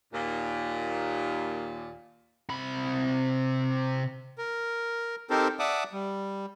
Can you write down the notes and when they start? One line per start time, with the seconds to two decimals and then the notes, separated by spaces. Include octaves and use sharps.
0.13 D#2 A#2
2.50 C3 B5
4.38 A#4
5.30 C4 D#4 G4 A4 A#4 C5
5.59 D5 E5 F#5 A5 D6 D#6
5.92 G3